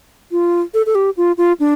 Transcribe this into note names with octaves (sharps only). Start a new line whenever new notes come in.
F4
A4
A4
G4
F4
F4
D4